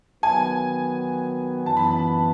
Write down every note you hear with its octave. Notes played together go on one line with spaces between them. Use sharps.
D#3 F#3 B3 G#5
F#2 E3 B3 A5
B5
A5